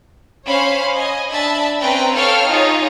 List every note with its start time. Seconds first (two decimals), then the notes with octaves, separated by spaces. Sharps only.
0.47 C#4 C5 C#5 F5 B5
0.94 D#5 G#5
1.29 D4 E5 A5 B5
1.80 C4 C#4 B4 G5 A#5
2.14 A4 C#5 F5 G5 F6
2.48 D#4 F4 G#4 C#5